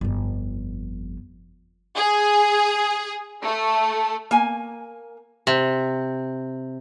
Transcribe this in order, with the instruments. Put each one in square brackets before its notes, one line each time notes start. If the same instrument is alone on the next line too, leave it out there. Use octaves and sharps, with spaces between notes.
[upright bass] G1 F2
[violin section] G#4
A3
[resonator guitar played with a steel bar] A#3 G#5
[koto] C3